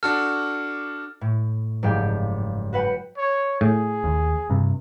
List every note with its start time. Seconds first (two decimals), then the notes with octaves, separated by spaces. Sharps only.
0.03 D4 F#4 A4 F6
1.21 A2
1.83 F#1 G#2 F3 G4 D5 G5
2.73 F#4 B4 F#5 G5 B5
3.17 C#5
3.61 A2 G#4
4.04 D#2
4.50 G2 C3